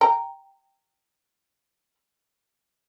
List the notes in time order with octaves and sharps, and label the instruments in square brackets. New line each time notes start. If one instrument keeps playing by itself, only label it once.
[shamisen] G5 A#5